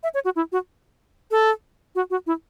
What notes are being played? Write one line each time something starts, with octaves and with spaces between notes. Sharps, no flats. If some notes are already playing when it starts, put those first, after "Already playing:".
E5
C#5
F#4
E4
F#4
A4
F#4
F#4
E4